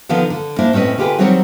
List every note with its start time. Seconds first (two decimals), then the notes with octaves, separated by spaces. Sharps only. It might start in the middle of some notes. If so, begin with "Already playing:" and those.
0.09 D3 D#3 F3 B3 F5
0.30 D3
0.59 A#3 D4 E4 C5
0.73 A2 C4 C#4 B4 D#5
0.98 D3 F4 G4 G#4 B4
1.19 D#3 F#3 G3 C4 F#4 C#5